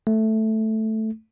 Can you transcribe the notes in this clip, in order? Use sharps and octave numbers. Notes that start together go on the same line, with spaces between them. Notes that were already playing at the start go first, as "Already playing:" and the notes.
A3